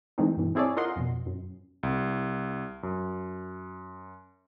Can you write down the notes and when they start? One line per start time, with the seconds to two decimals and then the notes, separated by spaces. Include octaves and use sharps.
0.18 D#3 E3 G#3 A3 C4 D#4
0.37 G2 B2 E3
0.55 C4 E4 G#4 A4 C#5 D5
0.77 F4 A#4 D#5 F#5 C6
0.96 F2 B2
1.26 F#2
1.83 C2
2.83 F#2